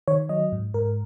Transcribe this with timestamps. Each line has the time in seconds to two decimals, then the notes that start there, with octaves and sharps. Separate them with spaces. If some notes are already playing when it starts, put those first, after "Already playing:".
0.08 D#3 C#5
0.29 F#3 D#5
0.52 G#2
0.74 G#2 A#4